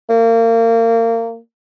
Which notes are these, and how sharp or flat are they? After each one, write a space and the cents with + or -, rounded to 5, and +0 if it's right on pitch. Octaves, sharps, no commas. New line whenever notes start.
A#3 -30